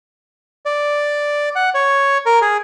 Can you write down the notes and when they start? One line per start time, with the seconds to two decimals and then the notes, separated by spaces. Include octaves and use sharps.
0.66 D5
1.56 F#5
1.74 C#5
2.26 A#4
2.42 G#4